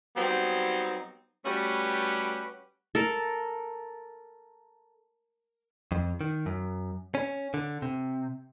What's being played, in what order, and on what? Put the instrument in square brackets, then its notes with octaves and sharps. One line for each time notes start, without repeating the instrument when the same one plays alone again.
[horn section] F#3 G3 B3 C4 D#4
G3 A3 C#4 F#4 G4 B4
[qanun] A4 A#4
[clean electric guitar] F2
D#3
F#2
C#4
D3
C3